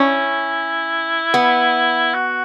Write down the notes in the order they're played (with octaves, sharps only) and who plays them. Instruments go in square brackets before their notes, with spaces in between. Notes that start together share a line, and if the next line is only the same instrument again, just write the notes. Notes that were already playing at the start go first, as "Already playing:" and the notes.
Already playing: [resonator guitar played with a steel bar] C#4 [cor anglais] E4
[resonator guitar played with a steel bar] B3
[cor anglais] F#4